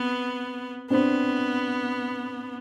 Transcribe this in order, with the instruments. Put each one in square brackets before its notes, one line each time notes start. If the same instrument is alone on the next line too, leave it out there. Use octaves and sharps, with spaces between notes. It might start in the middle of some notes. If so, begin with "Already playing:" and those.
Already playing: [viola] B3 [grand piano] C4
[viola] B3 [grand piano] C4 D4